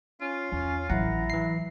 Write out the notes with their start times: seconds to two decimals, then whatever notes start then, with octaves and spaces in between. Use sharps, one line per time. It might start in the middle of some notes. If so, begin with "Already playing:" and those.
0.21 C#4 F4
0.52 E2 C#4
0.90 A1 F#3 E4 F#5 A#5
1.30 E3 C7